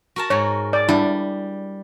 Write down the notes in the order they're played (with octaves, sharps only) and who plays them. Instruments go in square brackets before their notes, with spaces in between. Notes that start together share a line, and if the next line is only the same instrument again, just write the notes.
[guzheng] F#4 A#4 A5
[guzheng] G#2 F#4 [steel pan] C#5
[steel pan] D5
[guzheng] G3 [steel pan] D4 E4